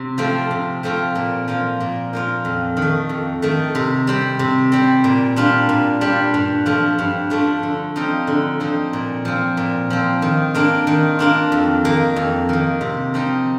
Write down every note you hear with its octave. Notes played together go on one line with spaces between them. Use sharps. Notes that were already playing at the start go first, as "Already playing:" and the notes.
Already playing: C3
F3 A3 C4 F4
C3
F3 A3 C4 F4
A#2
F3 A#3 F4
A#2
F3 A#3 F4
F2
D#3
A3
F2
D#3 A3
C3
G3 C4
C3
G3 C4
A#2
G3 D4 F4
A#2
G3 D4 F4
G2
F3 A3 D4 F4
G2
F3 A3 D4 F4
D3
F3 C4 D#4
D3
F3 C4 D#4
A#2
F3 C4
A#2
F3 C4
D#3
A#3 D4 F4
D#3
A#3 D4 F4
F2
D#3 A#3
F2
D#3 A#3
C3
F3 C4 D#4